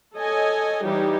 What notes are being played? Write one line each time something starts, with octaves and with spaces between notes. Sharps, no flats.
A4 C#5 D#5 G#5
E3 G3 D#4 G4 C#5